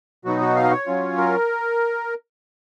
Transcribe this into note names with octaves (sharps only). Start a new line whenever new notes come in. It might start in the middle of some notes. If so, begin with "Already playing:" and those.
B2 F#3 B3 D#4 F#4
F#4
F5
D#5
C#5
F#3 C#4 F4
A#4